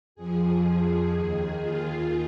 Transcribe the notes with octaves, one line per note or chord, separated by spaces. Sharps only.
F2 F3 G#4
D#2 D#3 G#4
F4